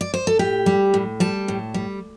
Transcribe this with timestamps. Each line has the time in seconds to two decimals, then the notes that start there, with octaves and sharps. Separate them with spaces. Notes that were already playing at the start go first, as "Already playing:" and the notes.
0.01 D5
0.14 C5
0.27 A4
0.39 A2 G4
0.66 G3
0.94 A2
1.20 G3 A5
1.48 A2
1.74 G3